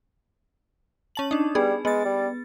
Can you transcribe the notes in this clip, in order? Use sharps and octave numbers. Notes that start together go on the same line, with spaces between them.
C#4 A5 F#7
D4 D#4
G3 B3 G#4
G#3 B3 A6
G3